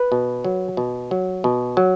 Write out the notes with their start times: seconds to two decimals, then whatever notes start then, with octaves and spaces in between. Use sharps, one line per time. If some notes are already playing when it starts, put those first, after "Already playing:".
Already playing: B4
0.12 B2
0.44 F#3
0.77 B2
1.11 F#3
1.44 B2
1.77 F#3